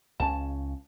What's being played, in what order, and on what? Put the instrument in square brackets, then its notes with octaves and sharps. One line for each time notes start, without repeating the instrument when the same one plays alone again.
[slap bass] C#2 C#3 C#4 [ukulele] A5